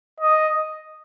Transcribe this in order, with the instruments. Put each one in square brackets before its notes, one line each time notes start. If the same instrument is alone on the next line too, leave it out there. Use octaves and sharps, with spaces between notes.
[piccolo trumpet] D#5